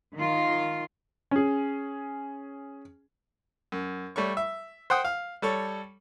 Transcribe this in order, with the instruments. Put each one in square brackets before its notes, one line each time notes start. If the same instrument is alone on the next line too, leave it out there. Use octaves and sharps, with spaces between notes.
[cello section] D#3 F4
[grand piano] C#4 G#4
[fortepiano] F#2
G3 A3 C#5 C#6
E5
C5 F#5 G5 D#6
F5
G3 A4 C#5